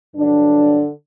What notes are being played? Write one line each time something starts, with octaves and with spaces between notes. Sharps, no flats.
G2 D3 F#3 D4